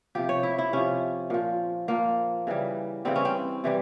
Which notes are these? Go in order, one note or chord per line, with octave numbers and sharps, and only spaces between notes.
C3 F3 G4
C#5
E4
E4
C3 F3 C#4
A#2 F3
A#2 F3 A#3
C#3 E3 G3
C#3 E3 G3 C4
C#4
C4
C3 E3 G3